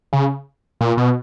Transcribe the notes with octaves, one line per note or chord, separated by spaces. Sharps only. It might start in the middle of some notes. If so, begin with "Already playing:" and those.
C#3
A#2
B2